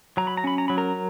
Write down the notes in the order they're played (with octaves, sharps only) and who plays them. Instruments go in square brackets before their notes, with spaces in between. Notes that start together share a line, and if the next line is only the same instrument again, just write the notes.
[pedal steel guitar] F#3 A#5
B5
A#5
C#4 B5
A#5
F#3 B5
A#4 A#5